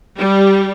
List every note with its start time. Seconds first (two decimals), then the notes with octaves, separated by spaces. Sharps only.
0.18 G3